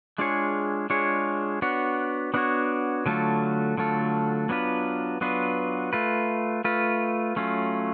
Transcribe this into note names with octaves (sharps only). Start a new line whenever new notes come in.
G#3 D4 F4 G#4 C#5
G#3 D4 F4 G#4 C#5
B3 D4 F#4 C#5
B3 D4 F#4 C#5
D3 F#3 A3 F4 A4
D3 F#3 A3 F4 A4
F#3 B3 D4 F4 B4
F#3 B3 D4 F4 B4
A3 F4 B4
A3 F4 B4
F#3 A3 C#4 F4